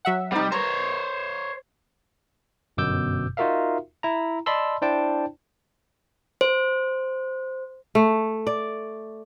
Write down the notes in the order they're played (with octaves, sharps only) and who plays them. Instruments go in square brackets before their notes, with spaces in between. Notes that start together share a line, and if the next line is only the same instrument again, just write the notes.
[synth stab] F#3 E5 F#5
[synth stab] C3 D#4 [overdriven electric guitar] G3
[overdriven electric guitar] C5 C#5 [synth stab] A#5
[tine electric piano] G1 F#2 B2 D6 E6 G6
D#4 F4 F#4 A#4 E5 F5
E4 A#5
D5 D#5 A5 B5 C6 E6
D4 E4 C5 D5 G5 A5
[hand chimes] C5
[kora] A3
D5